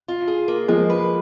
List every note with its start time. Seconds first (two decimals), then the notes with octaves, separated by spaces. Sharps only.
0.08 F4
0.28 G#4
0.48 A#3
0.68 F3 G#3 A#3
0.90 B4